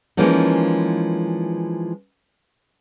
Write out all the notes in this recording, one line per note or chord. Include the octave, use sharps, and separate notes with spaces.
E3 F3 G#3 A#3 C#4 D#4